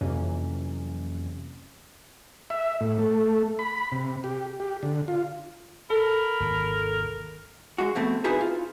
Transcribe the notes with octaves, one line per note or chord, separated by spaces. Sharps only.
F2 C3 E3 F#3 A#3 C#4
E5
A2
A3
B5
C3
G4
G4
D3
F4
A4 A#4 B5
G#1 D#2 D#3
G#3 F#4
F2 B2 A3 C4
D#4 E4 F#4 G#4 B4 C5
F4